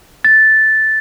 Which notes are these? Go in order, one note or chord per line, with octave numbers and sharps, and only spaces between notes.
A6